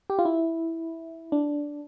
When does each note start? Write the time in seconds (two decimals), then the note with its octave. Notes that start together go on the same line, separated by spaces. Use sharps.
0.10 G4
0.19 F4
0.25 E4
1.32 D4